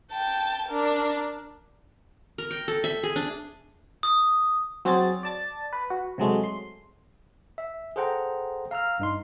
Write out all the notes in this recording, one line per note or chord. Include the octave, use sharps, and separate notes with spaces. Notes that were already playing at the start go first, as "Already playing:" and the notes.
G5 A5
D4 A#4
A#4
G5
A4
E5
G#4
D4
D#6
F#3 C4 F#4 G#4 A6
D5 A5 A6
B4
F#4
C3 F#3 G#3 A3
C6
E5
G#4 A4 C5 F#5 G5 A#5
F5 A#5 E6 F6
G2 D#4 C6